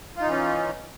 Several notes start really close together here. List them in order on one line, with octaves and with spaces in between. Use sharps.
F4 D#4 E3 C#4